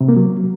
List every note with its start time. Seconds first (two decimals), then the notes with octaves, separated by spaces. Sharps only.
0.01 C3
0.09 A#3
0.17 F#3